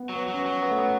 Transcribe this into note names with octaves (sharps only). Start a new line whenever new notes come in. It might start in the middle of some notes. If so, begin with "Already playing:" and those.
Already playing: B3
F#3
B3
F#3
C#4
B3
F#3
B3
A3
B3